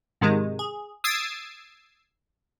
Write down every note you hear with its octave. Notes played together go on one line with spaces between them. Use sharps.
G#2 C3 D#3 G#3
G#4
D#6 E6 G#6 A6 C7 D7